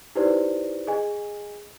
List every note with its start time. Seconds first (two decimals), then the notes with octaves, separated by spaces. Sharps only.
0.15 D#4 E4 G4 B4 C5 D5
0.87 G#4 D#5 G#5